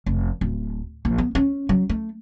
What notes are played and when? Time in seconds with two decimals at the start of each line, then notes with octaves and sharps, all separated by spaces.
0.06 F1
0.41 D1
1.05 A#1
1.18 B3
1.35 C#4
1.69 F#3
1.89 A3